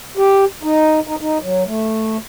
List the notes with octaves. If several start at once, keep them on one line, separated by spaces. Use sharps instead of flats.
G4
D#4
D#4
D#4
F#3
A3